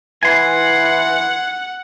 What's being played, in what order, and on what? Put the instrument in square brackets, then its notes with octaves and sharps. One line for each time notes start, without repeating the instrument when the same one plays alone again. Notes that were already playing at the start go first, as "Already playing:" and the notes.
[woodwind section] E3 [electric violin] F#5 [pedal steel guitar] G#5 C6